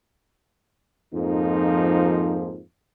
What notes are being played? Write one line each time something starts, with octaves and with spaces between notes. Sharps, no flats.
F2 G#2 F3 A#3 D#4